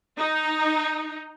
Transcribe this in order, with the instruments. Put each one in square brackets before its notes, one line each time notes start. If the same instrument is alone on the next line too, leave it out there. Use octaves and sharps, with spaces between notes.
[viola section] D#4